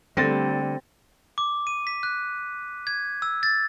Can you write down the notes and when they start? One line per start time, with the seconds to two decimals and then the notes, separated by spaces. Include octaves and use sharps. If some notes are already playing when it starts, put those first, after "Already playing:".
0.17 D3 G3 A3 C4 A4 A6 A#6
1.38 D6
1.67 D#7
1.87 B6
2.03 F#6
2.87 G#6
3.22 E6
3.43 A6